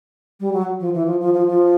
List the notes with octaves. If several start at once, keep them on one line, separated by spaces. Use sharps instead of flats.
G3
F#3
F3
E3
F3
F3
F3
F3